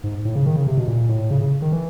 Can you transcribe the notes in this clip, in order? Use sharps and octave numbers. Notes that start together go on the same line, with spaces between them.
G#2
A2
C#3
D#3
C#3
C3
B2
A#2
A2
C#3
C#3
D#3
E3